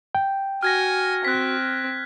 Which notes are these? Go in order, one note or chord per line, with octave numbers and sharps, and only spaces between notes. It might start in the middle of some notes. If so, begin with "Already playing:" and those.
G5
F#4 G#5 F6 G#6 A#6
C4 F#6 B6